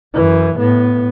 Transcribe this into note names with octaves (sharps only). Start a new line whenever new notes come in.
F#2 E3
A2 B3